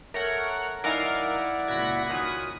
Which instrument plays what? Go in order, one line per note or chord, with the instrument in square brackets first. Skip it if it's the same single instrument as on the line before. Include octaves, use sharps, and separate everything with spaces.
[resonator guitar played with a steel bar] A3 [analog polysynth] A#4 C#5 F#5
[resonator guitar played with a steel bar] F#2 D#4 G#5 [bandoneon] E4 D5 F#5 [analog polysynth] A#4 F5
[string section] C#2 A#2 A#6 [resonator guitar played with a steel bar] F#3 [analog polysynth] B5 F#6 G#6
[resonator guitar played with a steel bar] A#2 D#3 F#3 [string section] D#6